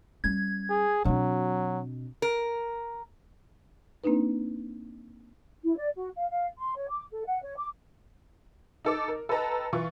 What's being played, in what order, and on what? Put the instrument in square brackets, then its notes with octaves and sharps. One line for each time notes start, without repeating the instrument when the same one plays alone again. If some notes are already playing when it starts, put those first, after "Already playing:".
[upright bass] G3 C#4 [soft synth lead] G#6
[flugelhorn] G#4
[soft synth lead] B2 [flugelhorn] F#3 [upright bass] C4 D4
[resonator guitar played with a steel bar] A#4
[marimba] A#3 C4 D4 D#4 B4
[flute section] E4
D5
F#4
F5
F5
C6
C#5
D6
A4
F#5
C#5
D6
[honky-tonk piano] D#4 A4 D6
A#4
A4 B4 D#5 G5 A5 A#5
E3 F4 C#6